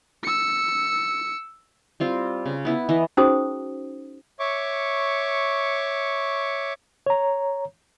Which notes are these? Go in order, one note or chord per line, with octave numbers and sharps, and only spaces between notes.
E6 C#7
G3 C4 F4
C#3
B3 E4
E3 D#5
C#4 D#4 F#4 G#4 C5 D#6
C#5 E5 C#6 D6
C#5 A#5